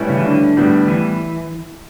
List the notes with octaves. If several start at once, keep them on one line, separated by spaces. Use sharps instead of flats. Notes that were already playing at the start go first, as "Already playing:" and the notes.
Already playing: A2 G3 C#4 E4 B4
C#3
E3
D3
A2 G3 B3
E3